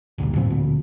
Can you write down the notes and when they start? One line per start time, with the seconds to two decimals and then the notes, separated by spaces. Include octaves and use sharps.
0.18 F#1 D2 G2 A#2
0.35 F2 A2 F3 C4
0.50 D2 A#2